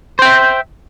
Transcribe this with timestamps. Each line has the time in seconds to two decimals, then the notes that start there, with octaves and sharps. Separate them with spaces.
0.19 C5
0.22 G5
0.25 E5